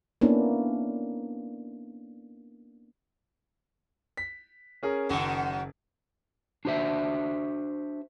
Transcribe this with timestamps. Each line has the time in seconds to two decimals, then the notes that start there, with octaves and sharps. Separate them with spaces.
0.21 A#3 B3 C#4 D4 E4
4.17 B6
4.83 C#4 G#4 A#4
5.09 F#1 F#2 D#3 F#4
6.65 D4 F#4 C5 E5